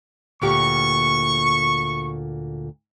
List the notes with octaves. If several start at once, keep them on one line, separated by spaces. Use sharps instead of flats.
D2 A#2 G4 C#6